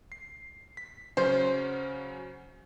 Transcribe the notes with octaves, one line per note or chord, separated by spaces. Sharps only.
C7
B6
C#3 F#3 C#4 C5